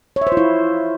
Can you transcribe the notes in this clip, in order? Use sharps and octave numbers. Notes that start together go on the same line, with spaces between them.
C#5
E5
C5
F4
E4